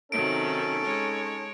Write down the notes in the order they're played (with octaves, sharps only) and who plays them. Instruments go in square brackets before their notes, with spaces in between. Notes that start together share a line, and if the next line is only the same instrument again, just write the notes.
[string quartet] C3 D#3 F#3 [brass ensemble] C#4 D#4 A4 [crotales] D7
[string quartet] G#3 C#5